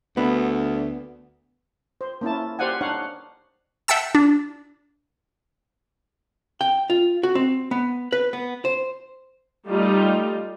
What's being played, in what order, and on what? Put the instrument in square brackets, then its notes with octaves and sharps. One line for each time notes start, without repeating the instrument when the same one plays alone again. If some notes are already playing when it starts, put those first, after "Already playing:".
[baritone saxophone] D2 [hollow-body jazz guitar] B3
[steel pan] C5
A#3 C#4 E4 A5
G4 C5 D5 F5 F#5 G#5
D4 D#4 C#5 F5 F#5
[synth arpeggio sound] E5 F#5 G5 A5 E6
D4
[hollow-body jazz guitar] G5
F4
F#4
C4
B3
B4
B3
C5
[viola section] G3 A3 D#4 F4 G4